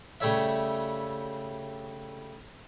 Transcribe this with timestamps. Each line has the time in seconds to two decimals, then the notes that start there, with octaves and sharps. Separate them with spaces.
0.21 C#3 G3 A3 C#5 E5